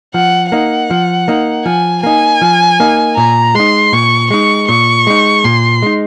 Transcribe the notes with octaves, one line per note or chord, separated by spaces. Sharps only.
F3 F#5
A#3 D#4 F#5
F3
A#3 D#4
F3 G#5
A#3 D#4 G#5
F3
A#3 D#4
A#2 A#5
G#3 D#4 C6
A#2 C#6
G#3 D#4 C#6
A#2 C#6
G#3 D#4
A#2 C6
G#3 D#4